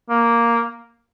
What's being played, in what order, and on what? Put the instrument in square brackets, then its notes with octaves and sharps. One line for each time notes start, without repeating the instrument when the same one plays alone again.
[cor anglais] A#3